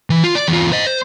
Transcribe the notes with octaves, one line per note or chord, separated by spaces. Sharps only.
E3
F4
D5
E2 F4
C5 D#5
C5